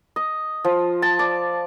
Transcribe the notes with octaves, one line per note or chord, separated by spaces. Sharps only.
D#5
F3
A5
D5